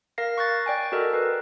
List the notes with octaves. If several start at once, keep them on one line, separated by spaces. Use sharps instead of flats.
A#4 F5 A#6 C7
C#6 F#6 A6
D5 G5 G#5
F#4 A4 A#4 D#5
B4